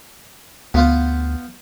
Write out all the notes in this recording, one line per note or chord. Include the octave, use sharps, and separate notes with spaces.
D2 B3 F4 C5